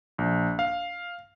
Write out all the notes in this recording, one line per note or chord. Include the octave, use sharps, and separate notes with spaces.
A#1
F5